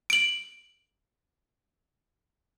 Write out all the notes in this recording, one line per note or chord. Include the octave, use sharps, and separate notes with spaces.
D7 F#7